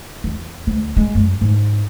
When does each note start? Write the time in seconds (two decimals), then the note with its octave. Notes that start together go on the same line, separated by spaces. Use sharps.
0.24 E2
0.67 D2
0.97 G#3
1.15 F#2
1.41 G#2